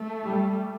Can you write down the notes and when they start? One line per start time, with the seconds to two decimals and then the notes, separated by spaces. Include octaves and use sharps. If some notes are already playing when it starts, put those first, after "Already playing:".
Already playing: A3
0.28 G3